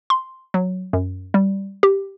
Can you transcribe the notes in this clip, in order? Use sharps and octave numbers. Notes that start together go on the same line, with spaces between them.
C6
F#3
F#2
G3
G4